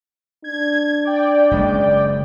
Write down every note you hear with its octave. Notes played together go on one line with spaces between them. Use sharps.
D4 G#6
D5 G5
F#1 C#3 G#3